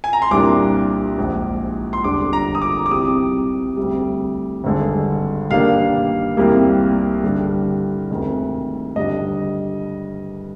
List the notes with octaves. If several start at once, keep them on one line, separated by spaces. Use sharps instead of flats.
G#5
A#5
C6
C2 A#2 G3 A#3 D4 D6
A#1 G#2 F3
C6
G1 F2 D3 G3 D4 D6
A#5
D#6
D6
D6
C2 C3 G3 C4 D#6
D2 C3 G3
G#1 G2 D3 G#3
G2 D#3 G3 A#3 D4 F5
C2 C3 G3 A#3
G2 D3 G3 D4
D2 C3 D#3 G#3
G2 D3 G3 D4 D#5